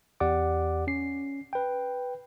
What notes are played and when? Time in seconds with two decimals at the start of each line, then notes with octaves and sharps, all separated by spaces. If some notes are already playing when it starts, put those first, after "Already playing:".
0.20 E2 G4 D5 F#5 D6
0.87 C#4 C7
1.53 B4 G5